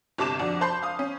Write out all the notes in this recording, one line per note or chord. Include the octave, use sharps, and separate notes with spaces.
G1 C3 A5 D6 E7
F2 D4 F#4
C5 A5 B5 C6 G6 C7
F5 D#6
C#4